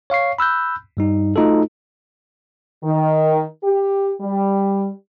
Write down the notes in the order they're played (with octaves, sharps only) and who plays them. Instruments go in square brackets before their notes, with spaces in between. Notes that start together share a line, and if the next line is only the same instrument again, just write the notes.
[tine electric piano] C#5 F5 C#6 C7
B5 E6 F#6 G6
G2 G3 D#4
A3 D#4 F4 F#4 A4
[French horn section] D#3
G4
G3